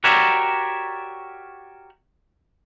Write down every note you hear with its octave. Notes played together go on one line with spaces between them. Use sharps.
F#4 G4 A#4 C#5 D5 E5